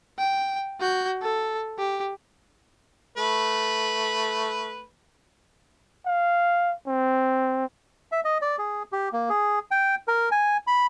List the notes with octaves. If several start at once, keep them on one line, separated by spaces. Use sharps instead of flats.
G5
F#4 G6
A4
G4
A3 B4
F5
C4
E5
D#5
D5
G#4
G4
A#3
G#4
G5
A#4
G#5
B5